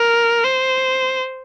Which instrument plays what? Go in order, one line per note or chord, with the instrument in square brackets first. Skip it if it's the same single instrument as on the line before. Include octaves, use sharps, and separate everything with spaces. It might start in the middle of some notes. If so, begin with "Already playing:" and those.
Already playing: [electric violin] A#4
C5